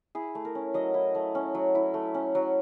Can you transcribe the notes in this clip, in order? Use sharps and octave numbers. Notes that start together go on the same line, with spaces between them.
E4 G#4
A3
A#4
C#4
F#3 D#5
E4
A3
C#4
F#3
E4
A3
C#4
F#3